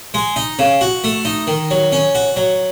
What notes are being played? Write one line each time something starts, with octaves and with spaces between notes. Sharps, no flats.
G#3
D#4
C#3
F#4
A3
D#4
D#3
F#3
C#4
F#4
F#3